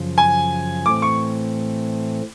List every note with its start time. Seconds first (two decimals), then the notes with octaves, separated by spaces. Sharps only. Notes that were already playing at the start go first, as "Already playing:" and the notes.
Already playing: F#2 C#3 F3
0.18 G#5
0.86 A2 E3 A3 C4 D6
1.02 C#6